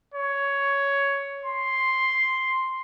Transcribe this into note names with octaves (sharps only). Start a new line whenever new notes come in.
C#5
C6